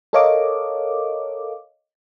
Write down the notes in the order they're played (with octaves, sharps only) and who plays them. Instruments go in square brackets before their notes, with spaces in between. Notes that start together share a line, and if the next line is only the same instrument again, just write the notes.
[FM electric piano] A4 A#4 C#5 D#5 F5 D6